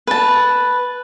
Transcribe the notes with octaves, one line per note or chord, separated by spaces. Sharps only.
B4 A5